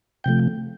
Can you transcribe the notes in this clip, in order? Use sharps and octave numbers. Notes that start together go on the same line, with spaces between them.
C3 F3 A3 G5